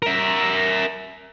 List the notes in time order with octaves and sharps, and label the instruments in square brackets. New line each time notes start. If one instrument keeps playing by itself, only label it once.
[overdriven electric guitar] A#4 E5